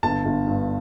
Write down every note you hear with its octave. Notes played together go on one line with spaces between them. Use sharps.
G1 A5
G1
G2